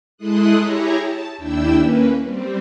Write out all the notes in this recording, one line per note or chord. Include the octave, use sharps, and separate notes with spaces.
G#3 E4 A4 C6 D#6 F#6
E4 G4 G#4 C#5 A#5
A5
D#2 D4 E4 G5 E6
A#3 C#4 B4
G3 C4